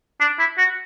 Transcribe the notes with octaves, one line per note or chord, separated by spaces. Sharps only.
D4
E4
F#4